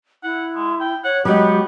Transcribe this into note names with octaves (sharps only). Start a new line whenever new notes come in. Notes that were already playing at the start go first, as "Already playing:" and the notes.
E4 F#5
G#3
G5
C#5 F#5
F#3 G#3 B3 G4